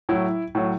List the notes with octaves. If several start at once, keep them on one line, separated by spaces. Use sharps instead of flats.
A2 F#3 E4
A2 F#3